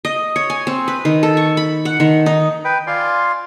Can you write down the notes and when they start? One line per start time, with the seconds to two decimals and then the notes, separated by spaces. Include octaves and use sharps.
0.05 D#5
0.36 C#5
0.50 G#5
0.67 C4
0.88 B4
1.05 D#3
1.23 A4
1.37 C#6
1.57 B5
1.85 F#5
2.00 D#3
2.26 D#4
2.65 B4 G5
2.87 F4 D5 G#5 C6